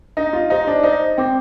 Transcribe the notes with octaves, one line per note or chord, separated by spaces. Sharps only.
D4 D#4
F4
D#4 G4 C5
D4
D#4 C5
C4 G5 D6